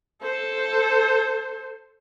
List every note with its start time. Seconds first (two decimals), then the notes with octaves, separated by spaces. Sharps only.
0.22 A4 C5